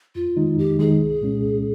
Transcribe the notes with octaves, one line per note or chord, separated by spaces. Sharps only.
F2 F4
D#3 G#3 D#4
F2 G4
D#3 G#3 D#4 G#4
C2
A#2 G#3 C#4
C2